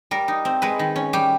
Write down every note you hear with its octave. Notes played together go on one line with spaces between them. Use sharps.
G3 A#4
D#4
C4
G#3 B4
D#3
C#4
G3 G4